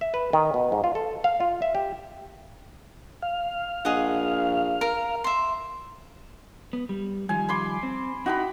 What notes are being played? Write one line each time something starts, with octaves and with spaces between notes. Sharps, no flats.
E5
B4
D#3
B2
G#2
F4
A4
F5
F4
E5
G4
F5
A#1 G#4 D#5 F#5
A#4
E5 C6
B3
G3
D#3 F3 G3 G#5
B5 C6 D6
C4
D#4 E4 F#4 G5 B5